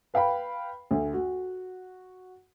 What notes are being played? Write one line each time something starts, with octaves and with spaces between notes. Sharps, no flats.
B4 F5 G5 B5
D2
F#4